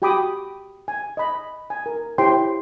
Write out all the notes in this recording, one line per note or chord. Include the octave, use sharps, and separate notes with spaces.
F#4 G4 G5 B5 D6 D#6
G#5
D#5 B5
G#5
A#4
E4 G4 C5 C#5 G5 C6